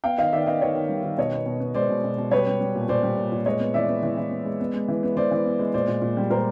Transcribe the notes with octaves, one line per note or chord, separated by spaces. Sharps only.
B3 F5 G5
D#3 D#5 F5
D#3 D5 E5
B3 D#5 F5
D#3 C#5 D#5
D#3
G3
D#3
B2 C#5 D#5
B3
B2
B3
G#3 C5 D5
B2
B2
B2
G3 B4 C#5
G3
G3
A#2
A#2 C5 D5
G3
A#2
A#2
G#3 C#5 D#5
B3
E3 D5 E5
B3
E3
E3
B3
G#3
B3
G#3
E3
B3
E3 C5 D5
E3
B3
G#3
A#2 C5 D5
A#2
A#2
G3
A#2 A#4 C5